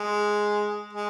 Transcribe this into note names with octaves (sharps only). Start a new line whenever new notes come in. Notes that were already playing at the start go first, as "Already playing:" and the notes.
Already playing: G#3
G#3